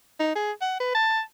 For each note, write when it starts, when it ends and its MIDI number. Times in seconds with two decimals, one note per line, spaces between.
0.20 0.35 63
0.35 0.52 68
0.61 0.76 78
0.80 0.92 71
0.94 1.20 81